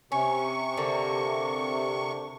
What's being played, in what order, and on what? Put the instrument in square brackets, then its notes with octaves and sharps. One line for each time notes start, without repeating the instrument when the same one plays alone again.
[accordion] C3 C#6 [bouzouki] C#4
[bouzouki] D3 A#3